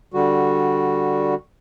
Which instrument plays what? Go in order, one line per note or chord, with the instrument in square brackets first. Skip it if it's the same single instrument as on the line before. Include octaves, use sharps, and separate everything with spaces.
[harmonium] D3 G3 F#4